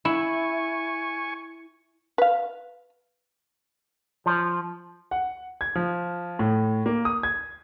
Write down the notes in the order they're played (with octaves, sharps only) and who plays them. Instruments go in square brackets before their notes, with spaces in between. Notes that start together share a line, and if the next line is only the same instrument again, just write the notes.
[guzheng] E4 [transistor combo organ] G#5 C#6
[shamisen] B4 F5
[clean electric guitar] F3
[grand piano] F#5
G#6
F3
A2
A#3
D#6
G#6